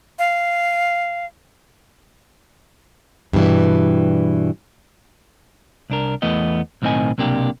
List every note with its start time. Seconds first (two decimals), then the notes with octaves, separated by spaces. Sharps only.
0.19 F5
3.33 G2 B2 E3 G3
5.90 C2 D4 A#4
6.22 E2 E3 A3 B3 D#5
6.82 B1 A2 D#3 C4 D#5 G#5
7.18 B1 C3 A#3 D4 G4